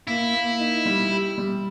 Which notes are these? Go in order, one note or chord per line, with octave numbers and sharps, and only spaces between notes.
A#3 E4
A#3
D#4
G3
G4
G3